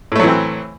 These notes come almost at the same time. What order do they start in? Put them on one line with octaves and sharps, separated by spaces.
A2 A3 F#3 E3 C4